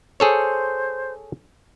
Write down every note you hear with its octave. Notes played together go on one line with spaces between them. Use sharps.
G#4 A4 C5 C#5